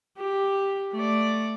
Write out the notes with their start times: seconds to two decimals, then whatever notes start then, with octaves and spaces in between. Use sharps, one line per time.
0.18 G4
0.93 A3 D5